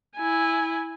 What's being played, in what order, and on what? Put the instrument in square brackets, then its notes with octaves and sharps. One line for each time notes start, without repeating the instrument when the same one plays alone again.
[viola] E4 G#5